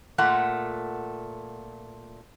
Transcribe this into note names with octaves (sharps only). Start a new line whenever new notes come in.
A#2 A3 F#5